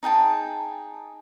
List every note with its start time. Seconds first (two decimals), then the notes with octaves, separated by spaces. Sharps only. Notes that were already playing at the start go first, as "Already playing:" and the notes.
0.03 D#4 G#4 G5 A5